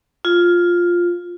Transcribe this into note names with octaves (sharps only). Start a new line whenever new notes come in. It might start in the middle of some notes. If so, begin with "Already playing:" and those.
F4